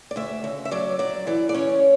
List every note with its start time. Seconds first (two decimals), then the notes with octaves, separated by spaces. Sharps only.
0.11 D5
0.16 D2 E5
0.44 C#3
0.65 E5
0.71 F#3 D5
0.99 F#3 D5
1.27 E3 D5
1.49 D5
1.54 C#4 C#5